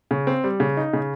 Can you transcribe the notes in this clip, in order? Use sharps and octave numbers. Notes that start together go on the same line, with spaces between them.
C#3
C4
G3
C#3
D#4
C#3